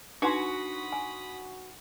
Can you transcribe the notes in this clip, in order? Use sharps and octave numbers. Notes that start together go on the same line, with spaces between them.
D4 D#4 F#4 B4 B5 C6 D#6
G#5